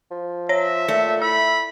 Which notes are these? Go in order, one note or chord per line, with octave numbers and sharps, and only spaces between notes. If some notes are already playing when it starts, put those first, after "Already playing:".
F3
C#5 E5 A#6
A#2 A3
E4 B5 E6